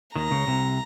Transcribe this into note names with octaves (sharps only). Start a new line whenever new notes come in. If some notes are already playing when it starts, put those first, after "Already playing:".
D#2 D#3 A#5
C#2 C#3
C2 C3